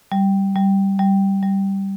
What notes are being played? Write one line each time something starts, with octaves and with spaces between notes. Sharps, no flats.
G3
G3
G3
G3